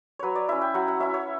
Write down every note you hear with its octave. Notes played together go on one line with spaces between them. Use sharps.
F#3 B4 C#5
D5
C#4 E4 E5
G5
F#3 F#5
F#5
C#4 E4 E5
C#5